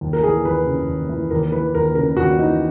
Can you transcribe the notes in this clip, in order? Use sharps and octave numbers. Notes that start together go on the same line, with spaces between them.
D#2
A#4
E3 G#4
D#2 B4
C#3
D#2
E3
D#2 A#4
E3 B4
D#2 A#4
C#3 A#4
D#2 F#4
E3 D#4